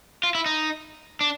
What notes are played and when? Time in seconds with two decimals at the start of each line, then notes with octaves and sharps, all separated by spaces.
0.23 F4
0.35 E4
0.46 D#4
1.21 D4